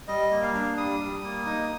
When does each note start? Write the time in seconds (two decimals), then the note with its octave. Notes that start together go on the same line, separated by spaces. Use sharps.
0.08 G3 D#5
0.31 A#3
0.43 F5
0.54 D4
0.77 G3 D#6
1.00 G3
1.23 A#3
1.46 D#4